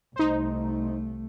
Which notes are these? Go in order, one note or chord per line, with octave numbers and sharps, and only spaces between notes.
C2 A3 D#4 C5